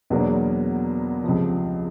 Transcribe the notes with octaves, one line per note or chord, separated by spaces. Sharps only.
E2 B2 F#3 A#3 D4
C#2 C3 F3